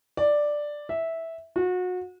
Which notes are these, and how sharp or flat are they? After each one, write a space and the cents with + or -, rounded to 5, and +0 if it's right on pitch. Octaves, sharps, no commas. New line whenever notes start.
D5 +5
E5 -10
F#4 -30